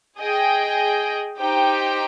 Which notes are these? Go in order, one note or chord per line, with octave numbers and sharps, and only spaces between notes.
G#4 D#5 G5
D#4 G4 C5 G5